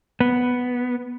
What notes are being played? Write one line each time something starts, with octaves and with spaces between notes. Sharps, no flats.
B3